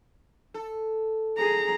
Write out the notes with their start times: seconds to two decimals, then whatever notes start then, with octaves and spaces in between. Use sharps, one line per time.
0.54 A4
1.38 G#4 A#5